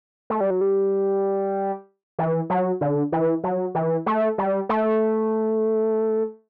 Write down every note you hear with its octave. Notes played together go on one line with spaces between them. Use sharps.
A3
G3
F#3
G3
E3
F#3
D3
E3
F#3
E3
A3
G3
A3